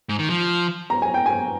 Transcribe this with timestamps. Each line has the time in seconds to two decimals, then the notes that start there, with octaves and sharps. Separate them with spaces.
0.09 G#2
0.19 D#3
0.30 F3
0.90 A#5
1.02 G#5
1.14 G5
1.26 G#5